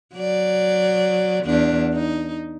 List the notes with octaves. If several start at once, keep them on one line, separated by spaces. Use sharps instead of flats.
F#3 D5
E2 D4
D#4